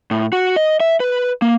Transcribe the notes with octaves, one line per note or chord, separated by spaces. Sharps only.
A2
F#4
D#5
E5
B4
A#3